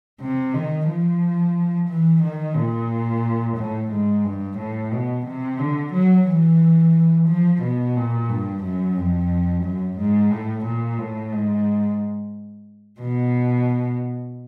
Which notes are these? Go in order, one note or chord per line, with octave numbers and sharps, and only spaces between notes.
C3
D#3
F3
E3
D#3
A#2
A2
G#2
G2
A2
B2
C3
D3
F#3
E3
F3
B2
A#2
G2
F#2
F2
F#2
G#2
A2
A#2
A2
G#2
B2